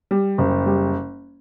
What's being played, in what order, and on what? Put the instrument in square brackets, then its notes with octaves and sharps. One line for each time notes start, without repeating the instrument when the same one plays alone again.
[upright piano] G3
F#1
G3